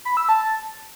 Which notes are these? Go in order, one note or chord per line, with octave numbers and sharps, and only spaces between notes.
B5
E6
A5